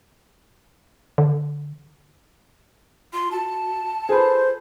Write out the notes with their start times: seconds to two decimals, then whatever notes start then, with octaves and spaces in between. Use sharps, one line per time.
1.18 D3
3.13 F4 C6
3.31 F#4 A5
4.09 F4 G#4 A4 B4 C5